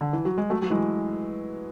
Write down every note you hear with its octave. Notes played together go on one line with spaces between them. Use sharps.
D3
E3
F#3
G#3
F#3 A3
F#3
E3 G#3